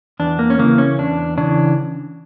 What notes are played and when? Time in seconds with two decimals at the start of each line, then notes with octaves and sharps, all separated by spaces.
0.20 E2 D4
0.39 A#3
0.50 C#4
0.59 C#3 E3 A#3
0.78 C#4
0.98 E2 D4
1.38 C#3 E3 D4